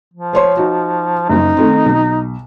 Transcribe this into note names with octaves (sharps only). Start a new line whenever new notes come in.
F3
C5 C#5 C6
D#4 F#4
F#1 F#2 D#4
D#3 A3 C4
B1